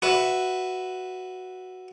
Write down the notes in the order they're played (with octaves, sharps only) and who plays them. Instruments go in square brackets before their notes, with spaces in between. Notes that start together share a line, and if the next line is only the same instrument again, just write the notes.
[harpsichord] F#4 B4 E5